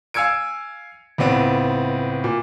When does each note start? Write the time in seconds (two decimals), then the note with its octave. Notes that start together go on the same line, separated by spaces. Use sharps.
0.14 F5 G#5 E6 G#6 C#7 D7
1.18 C#2 A2 B3 C4
2.24 A#2